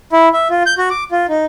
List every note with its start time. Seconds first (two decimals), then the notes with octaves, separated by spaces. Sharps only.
0.12 E4
0.33 E5
0.50 F4
0.66 G6
0.78 F#4
0.90 D6
1.11 F4
1.29 D#4